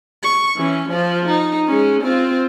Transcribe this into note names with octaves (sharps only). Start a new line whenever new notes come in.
C#6
E3 C#4
F3 F4
D#4
G#3 C#4
C4 F4